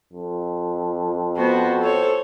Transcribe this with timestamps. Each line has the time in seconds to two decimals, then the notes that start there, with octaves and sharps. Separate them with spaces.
0.13 F2
1.36 B3 F#4 C5
1.80 A4 C5 C#5